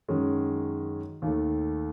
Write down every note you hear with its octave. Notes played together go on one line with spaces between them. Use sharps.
F#2 D#3 G#3 C#4
D#2 D#3 A3